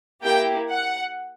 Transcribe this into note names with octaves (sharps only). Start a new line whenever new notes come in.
A#3 E4 G4 G5
F#5